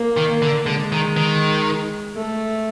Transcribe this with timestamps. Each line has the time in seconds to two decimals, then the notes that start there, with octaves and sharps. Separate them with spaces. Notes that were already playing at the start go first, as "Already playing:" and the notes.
Already playing: A#3
0.17 D#3
0.29 A#3
0.42 D3
0.66 D3 G#3
0.92 D#3
1.17 D#3
2.17 A3